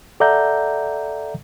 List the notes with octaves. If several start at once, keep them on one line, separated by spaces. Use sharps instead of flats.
A4 D5 E5 F#5 A#5 G6